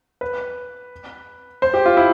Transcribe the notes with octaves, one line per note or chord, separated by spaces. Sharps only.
B4
C5
G4
F4
E4